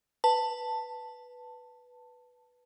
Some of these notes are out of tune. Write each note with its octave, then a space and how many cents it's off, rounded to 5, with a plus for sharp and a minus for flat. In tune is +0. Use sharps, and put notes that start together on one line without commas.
B4 +0 A5 +10